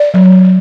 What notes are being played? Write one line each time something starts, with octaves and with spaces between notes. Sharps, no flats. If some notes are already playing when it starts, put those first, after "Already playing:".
Already playing: D5
F#3